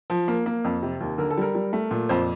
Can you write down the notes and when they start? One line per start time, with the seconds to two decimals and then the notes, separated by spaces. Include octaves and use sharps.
0.10 F3
0.28 A#3
0.46 A#3
0.64 F2
0.83 C3
1.01 D#2
1.18 D3 A#4
1.30 A4
1.37 G3 A#4
1.55 G3
1.73 A3
1.91 A#2
2.09 F2 C5